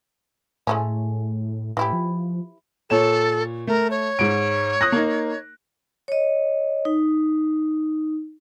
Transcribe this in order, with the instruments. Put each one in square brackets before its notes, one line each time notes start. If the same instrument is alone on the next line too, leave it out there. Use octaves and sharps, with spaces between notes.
[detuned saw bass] A2 [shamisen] G#3 A3 C#4
[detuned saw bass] A2 [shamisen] E3 E4 G4
[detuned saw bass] F3
[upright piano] A#2 C#5 E7 [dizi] A4
[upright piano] A3 [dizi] A#4
[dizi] C#5
[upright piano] G#2 D7
D#6 F#6 A#6
A#3 D#4
[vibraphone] C#5 D#5
D#4